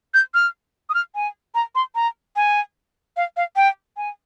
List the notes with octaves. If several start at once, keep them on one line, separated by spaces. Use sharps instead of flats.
G6
F6
D#6
F6
G#5
A#5
C6
A#5
G#5
F5
F5
G5
G#5